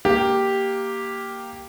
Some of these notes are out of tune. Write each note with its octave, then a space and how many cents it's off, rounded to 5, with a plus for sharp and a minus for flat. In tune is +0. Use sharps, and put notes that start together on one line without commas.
A#3 +0 G4 +0